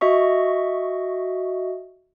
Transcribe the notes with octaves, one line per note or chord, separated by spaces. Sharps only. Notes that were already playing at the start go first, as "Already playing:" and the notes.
F#4 D#5 E5 C#6